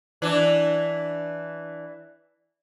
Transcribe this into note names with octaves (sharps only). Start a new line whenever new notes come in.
E3 D4